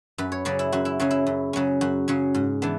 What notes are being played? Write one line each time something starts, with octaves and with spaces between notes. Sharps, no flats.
F#2 B4
C#5
C#3 F#3 C#4 D5
E4
F#2 F#4
E4
C#3 F#3 C#4
E4
F#2
C#3 F#3 C#4
F#2 F#4
C#3 F#3 C#4
G#2
E3 B3 D4